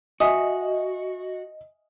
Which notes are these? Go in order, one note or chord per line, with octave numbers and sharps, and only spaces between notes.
F#4 D#5 E5 G#5 D#6